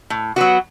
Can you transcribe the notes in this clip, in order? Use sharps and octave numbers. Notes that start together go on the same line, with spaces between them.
A2
F#3 B3 F#4